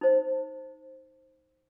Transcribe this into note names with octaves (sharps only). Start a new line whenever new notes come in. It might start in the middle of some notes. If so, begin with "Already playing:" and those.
D#4 C5